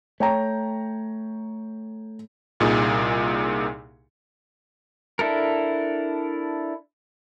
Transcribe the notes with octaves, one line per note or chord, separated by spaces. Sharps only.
A3 C#5 G5 A#5
C2 A#2 D#4 G#4
D4 E4 A4 A#4